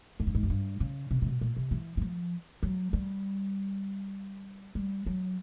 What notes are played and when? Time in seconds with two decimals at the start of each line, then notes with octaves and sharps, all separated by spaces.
0.20 G#2
0.27 G2
0.35 G#2
0.43 F#2
0.50 G2
0.80 C#3
1.11 C3
1.22 C3
1.26 B2
1.41 A#2
1.57 C3
1.71 E3
1.97 E3
2.02 F3
2.63 F#3
2.93 G3
4.75 G3
5.06 F#3